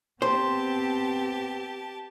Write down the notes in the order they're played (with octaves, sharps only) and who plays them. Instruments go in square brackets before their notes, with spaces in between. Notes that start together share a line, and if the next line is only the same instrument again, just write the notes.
[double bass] B3 C4 [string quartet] G4 A5 [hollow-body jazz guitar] C5